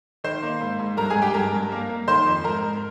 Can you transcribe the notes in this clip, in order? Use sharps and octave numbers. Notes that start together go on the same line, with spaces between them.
D#3 C5 C6
A#3
G#2
G#2
G2 A#4 A#5
G#4 G#5
G2
G4 G5
G2 A#4 A#5
G2
A#3
A#3
D#3 C5 C6
F2
G#2 A#4 A#5
G#2